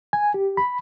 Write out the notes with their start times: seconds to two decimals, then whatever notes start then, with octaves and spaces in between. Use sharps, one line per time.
0.13 G#5
0.34 G4
0.57 B5